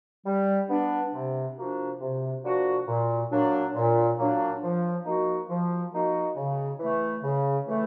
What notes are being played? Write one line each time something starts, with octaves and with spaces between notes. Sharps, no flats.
G3
B3 D4
C3
F3 A#3 D4 F#4
C3
F3 A#3 D4 F#4
A#2
F#3 A#3 D4
A#2
F#3 A#3 D4
F3
A#3 D#4 F#4
F3
A#3 D#4 F#4
C#3
E3
A3
C#3
E3 A3